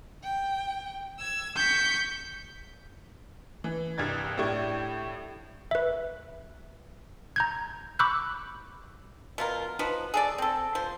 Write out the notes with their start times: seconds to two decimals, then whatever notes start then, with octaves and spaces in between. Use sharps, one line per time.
0.23 G5
1.19 E6 G#6
1.56 C#6 G6 B6
3.64 E3
3.98 C2 G2 G#6 A6
4.38 A2 D4 E4 G4 C#6 G#6
5.71 B4 E5
7.36 A#5 G6 G#6
7.99 B5 C#6 D6 E6 F#6 G6
9.38 B2 F4 A#4
9.79 F3 D#4 F#4 B4
10.14 G#4 A4 D5
10.38 C4 A4
10.75 F3 C5